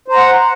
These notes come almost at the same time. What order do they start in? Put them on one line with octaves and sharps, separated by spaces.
C5 A#5 F#5